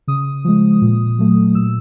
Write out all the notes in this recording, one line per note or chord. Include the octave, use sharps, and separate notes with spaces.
C#3 D#6
F3 G#3
A#2
F#3 A3
A#2 E6